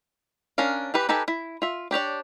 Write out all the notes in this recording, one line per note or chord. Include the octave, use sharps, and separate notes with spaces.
C#4 D4 A#4 F5
E3 G4 B4
D#4 G4 A4 B4 G#5
E4
F4 E5
D4 G4 C#5 D5